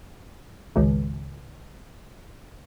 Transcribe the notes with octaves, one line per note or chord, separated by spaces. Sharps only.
G#1 C#2